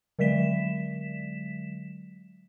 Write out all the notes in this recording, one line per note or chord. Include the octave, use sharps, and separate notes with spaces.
D3 F#3 G#3 B6 E7